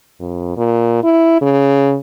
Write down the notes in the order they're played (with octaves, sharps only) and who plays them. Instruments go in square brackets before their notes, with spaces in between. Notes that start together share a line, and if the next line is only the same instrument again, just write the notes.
[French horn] F2
A#2
E4
C#3